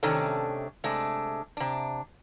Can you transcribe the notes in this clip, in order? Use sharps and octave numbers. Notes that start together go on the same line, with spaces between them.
C3 D#3 A3 C#4 D4 A4
C3 G#3 A3 D4
C3 D4